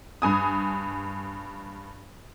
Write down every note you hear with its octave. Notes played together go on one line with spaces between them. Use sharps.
G2 G#5 D#6